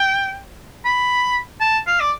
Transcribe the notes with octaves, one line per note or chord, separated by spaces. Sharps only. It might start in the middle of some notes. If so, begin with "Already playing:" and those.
Already playing: G5
B5
A5
F5
D5